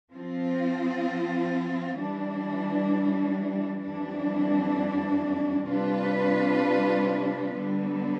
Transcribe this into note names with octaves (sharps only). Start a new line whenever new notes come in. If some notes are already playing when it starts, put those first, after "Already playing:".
F3 C4 F4
E3 G3 D4
F2 E3 G3 D4
C3 G3 D4 F4 B4
D3 G3 B3